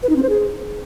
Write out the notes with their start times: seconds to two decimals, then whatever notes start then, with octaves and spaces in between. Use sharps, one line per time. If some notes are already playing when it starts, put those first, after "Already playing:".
0.03 B4
0.09 D#4
0.16 C4
0.23 C5
0.29 G#4